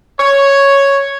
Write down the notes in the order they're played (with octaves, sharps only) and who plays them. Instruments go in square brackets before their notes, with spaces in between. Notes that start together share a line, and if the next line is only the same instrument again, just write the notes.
[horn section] C#5